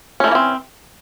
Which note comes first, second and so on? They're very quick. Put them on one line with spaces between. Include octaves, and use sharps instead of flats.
C#4 A3 E3 A#3 C4